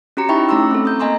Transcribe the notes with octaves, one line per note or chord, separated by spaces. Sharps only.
C#4 F#4 G4 A#5 C#7
D#4 E4 E5 G5 B5 C#6
A3 C#4 A#5 C6 E6
C4 A4
D#6 G6
A#3 D#5 G#5 A#5 C6 D#6